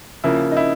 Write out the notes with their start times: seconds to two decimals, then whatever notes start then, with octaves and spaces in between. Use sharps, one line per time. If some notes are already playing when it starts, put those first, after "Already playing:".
0.24 C#3 F3 A#3 E4
0.51 D#4
0.57 E4